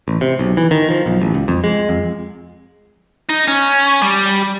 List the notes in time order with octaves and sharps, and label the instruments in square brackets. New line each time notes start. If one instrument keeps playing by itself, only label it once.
[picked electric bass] A1
C3
B1
E3
D#3
F3
B1
A1
C#2
F2
G#3
F2
[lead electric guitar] D#4
C#4
G3